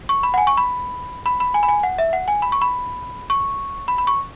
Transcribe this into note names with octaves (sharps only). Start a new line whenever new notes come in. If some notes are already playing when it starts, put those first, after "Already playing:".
C#6
B5
F#5
G#5
C#6
B5
B5
B5
G#5
B5
G#5
F#5
E5
F#5
G#5
B5
C#6
B5
C#6
B5
B5
C#6